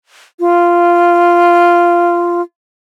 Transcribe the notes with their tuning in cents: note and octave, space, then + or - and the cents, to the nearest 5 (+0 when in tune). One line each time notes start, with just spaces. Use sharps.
F4 -10